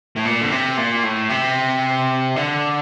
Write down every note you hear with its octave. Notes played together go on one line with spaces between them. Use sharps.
A2
A#2
D3
C3
A#2
A2
C3
D3